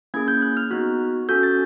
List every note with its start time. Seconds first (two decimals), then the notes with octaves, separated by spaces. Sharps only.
0.14 A#3 C#4 E4 G#4 G#6
0.28 G6
0.42 F#6
0.57 F6
0.71 B3 D#4 F#4 F#6
1.29 C#4 F#4 A4 G6
1.43 A6